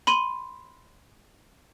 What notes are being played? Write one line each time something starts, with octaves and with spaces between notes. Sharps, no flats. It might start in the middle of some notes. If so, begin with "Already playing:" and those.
B5 C6 D#7